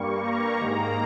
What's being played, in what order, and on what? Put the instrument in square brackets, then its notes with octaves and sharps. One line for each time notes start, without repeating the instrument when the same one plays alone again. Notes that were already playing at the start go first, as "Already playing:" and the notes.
Already playing: [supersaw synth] G2 G3 A#3 C#6
A#5
G#2 D#3 A#3